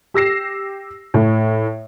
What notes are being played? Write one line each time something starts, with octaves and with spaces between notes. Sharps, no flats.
G4 E6 A#6 C7 E7
A2